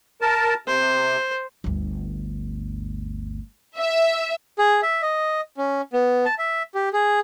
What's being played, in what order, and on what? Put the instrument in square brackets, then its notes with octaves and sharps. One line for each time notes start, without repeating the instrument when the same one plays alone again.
[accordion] A#4 A5
[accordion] C3 [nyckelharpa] C5
[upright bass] G1 D2
[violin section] E5
[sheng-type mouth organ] G#4
E5
D#5
C#4
B3
A5
E5
G4
G#4